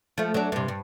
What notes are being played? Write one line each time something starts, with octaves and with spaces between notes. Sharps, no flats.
F3 A3
F#3 D4
G2 C3
G2